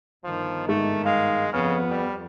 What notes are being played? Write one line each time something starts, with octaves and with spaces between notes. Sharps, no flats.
G1 D#3 F3
G#2 A3
G#3 F5
F2 C#3 B3 F6
G3